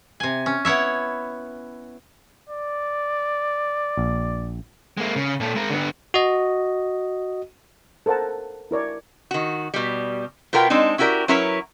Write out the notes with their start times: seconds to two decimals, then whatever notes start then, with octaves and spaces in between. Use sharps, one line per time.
0.20 C3 G#5
0.46 C#4
0.65 B3 E4 C#5 E5
2.50 D5
3.98 A#1
4.97 G#3 A#3
5.16 C#3
5.40 A#2 A4
5.55 G#3 A#4
5.70 D3 B3
6.14 F#4 D#5
8.06 A4 A#4 C5 F#5 A5
8.71 E4 A#4 C#5 D5
9.31 D#3 F#4
9.74 B2 G3
10.53 B2 B3 F4 A#4 B4 G5
10.70 G#3 C4 D4 D#4
10.98 C#4 E4 F#4 G4 A#4 D5
11.28 F#3 C#4 E4 A#4 B4 C#5